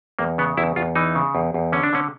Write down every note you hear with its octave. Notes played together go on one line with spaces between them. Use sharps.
E2 A#3
C#3 B3
E2 E4
E2 F4
E3 D#4
C#3
E2
E2
D3 C#4
D4
D3 C#4